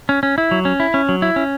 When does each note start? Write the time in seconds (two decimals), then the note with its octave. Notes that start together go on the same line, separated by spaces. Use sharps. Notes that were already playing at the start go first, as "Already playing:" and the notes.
0.09 C#4
0.23 C#4
0.38 E4
0.51 F#3
0.65 C#4
0.80 E4
0.94 C#4
1.09 F#3
1.22 E4
1.36 C#4